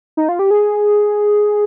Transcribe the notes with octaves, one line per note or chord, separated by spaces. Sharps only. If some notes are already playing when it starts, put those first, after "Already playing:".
D#4
F4
G4
G#4